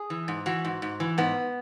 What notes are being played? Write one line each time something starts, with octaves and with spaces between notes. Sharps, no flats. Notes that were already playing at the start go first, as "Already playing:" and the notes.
Already playing: G#4
E3
G#2
E3 F#4
G#2
G#2
E3
G#2 B3